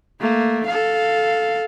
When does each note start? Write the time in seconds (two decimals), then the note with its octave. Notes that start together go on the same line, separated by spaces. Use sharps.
0.20 A3 A#3
0.66 A4 F5